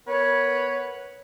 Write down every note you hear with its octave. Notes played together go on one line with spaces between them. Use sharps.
B3 A#4 B4 C#5